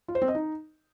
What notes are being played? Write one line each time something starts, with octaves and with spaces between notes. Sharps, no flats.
F4
C5
C4
D#5
D#4